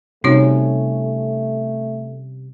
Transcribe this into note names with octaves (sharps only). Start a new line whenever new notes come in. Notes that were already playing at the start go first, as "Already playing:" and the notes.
C3 G3 A3 C#4 D#4 F#4 C#5